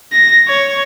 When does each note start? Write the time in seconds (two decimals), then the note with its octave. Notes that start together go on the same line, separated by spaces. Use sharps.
0.12 A#6
0.48 C#5